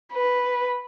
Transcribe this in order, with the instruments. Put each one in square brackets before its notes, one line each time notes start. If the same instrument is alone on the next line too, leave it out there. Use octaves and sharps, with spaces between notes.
[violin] B4